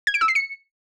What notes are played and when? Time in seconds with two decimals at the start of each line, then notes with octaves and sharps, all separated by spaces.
0.07 G#6
0.14 D7
0.21 E6
0.28 C7
0.35 C#7